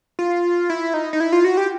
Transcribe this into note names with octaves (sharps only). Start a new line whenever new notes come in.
F4
E4
D#4
D#4
E4
F4
F#4
G4